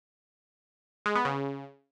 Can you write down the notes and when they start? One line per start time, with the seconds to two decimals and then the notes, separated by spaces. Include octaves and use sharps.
1.06 G#3
1.15 B3
1.25 C#3